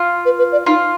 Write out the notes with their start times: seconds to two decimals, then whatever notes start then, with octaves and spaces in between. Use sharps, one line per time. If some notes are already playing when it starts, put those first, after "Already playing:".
Already playing: F4
0.25 B4
0.39 B4
0.52 D5
0.66 D#4 F4